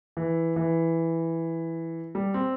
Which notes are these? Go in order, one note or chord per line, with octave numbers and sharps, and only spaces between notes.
E3
E3
G3
C4